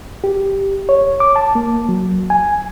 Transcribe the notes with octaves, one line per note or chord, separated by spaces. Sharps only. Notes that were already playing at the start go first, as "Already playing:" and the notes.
G4
C#5
D6
A5
A#3
F#3
G#5